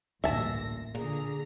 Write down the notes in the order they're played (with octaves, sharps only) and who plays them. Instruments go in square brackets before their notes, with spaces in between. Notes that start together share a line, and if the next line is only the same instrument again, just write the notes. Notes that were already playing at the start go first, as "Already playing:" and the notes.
[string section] A1 A#2 A#6 [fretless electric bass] D2 G2 [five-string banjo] E5 A5
[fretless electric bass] A#2 [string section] D3 A#5 [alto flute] G#4